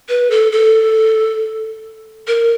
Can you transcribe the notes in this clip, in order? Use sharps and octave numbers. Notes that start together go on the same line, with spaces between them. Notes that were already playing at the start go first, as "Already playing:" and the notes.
B4
A4
A4
A#4